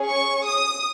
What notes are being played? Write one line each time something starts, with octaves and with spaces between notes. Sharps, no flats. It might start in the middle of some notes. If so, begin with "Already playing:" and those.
Already playing: C#4 G#4
C#6
D#6